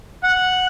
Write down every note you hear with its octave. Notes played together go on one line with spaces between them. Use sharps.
F#5